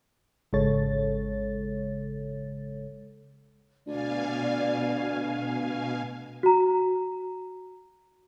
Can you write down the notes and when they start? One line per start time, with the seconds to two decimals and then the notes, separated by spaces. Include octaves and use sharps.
0.53 G#1 C#3 G#3 A4 C#5 A6
3.87 D2 B2 D5 F5 G#5
6.43 F#4 A#5